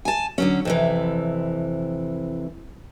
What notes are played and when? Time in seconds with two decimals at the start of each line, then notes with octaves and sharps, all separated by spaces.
0.05 G#5 A5
0.38 D3 F#3 C#4
0.65 F2 C3 E3